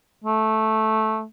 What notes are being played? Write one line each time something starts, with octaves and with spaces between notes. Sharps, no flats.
A3